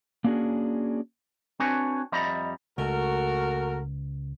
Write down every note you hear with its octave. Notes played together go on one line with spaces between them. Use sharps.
A#3 C#4 D4 F#4 G#4
C4 D4 F#4 B4 C#5 G#5
F2 G3 D#5 E5 A#5 B5
C#2 A3 F#4 A#4